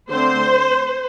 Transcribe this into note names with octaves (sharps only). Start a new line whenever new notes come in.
D3 A3 C4 C5